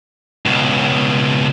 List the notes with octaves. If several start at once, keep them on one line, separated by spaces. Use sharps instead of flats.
C#2 B2